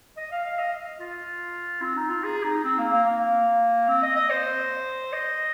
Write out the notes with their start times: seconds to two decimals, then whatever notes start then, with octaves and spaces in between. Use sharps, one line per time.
0.17 D#5
0.31 F5
0.44 F5
0.59 D#5
1.00 F4
1.82 C4
1.96 D#4
2.09 F4
2.23 G#4
2.43 D#4
2.64 C4
2.78 A#3
2.92 A#3
3.06 A#3
3.88 C4
4.03 D#5
4.16 D#5
4.30 C5
5.13 D#5